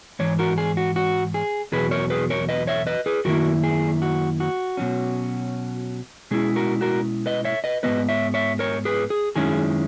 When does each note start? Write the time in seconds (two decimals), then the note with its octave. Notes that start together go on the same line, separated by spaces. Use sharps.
0.19 G#2 E3 C#5
0.39 F#4 A#4
0.58 G#4
0.77 F#4
0.96 F#4
1.34 G#4
1.72 E2 B2 F#3 G#4 B4
1.91 A#4 C#5
2.10 G#4 B4
2.30 A#4 C#5
2.49 B4 D#5
2.67 C#5 E5
2.87 B4 D#5
3.06 G#4 B4
3.25 F#2 D#3 A#3 E4 F#4 A#4
3.64 G#4
4.02 F#4
4.40 F#4
4.77 B2 F#3 C#4
6.31 B2 G#3 C#4 E4 G#4
6.56 F#4 A#4
6.81 F#4 A#4
7.26 B4 D#5
7.45 C#5 E5
7.64 B4 D#5
7.83 G#2 E3 B3 B4 D#5
8.09 C#5 E5
8.34 C#5 E5
8.59 A#4 C#5
8.85 G#4 B4
9.10 G#4
9.36 F#2 D#3 G#3 C#4 E4 G#4